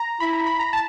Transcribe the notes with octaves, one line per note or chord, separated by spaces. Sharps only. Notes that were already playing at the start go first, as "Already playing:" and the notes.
Already playing: A#5
E4 B5
A#5
B5
A#5
A5